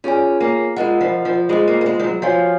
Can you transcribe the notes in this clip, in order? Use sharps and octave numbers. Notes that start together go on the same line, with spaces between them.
C#4 F4 G#4 C#5 G#5
A#3
G#3 F4 A#4 D#5 F#5
F3
F3
G#3 F4 G#4 C5 D#5
A#3
A#3
G#3
F3
F#3
F3 F#4 C#5 F5 G#5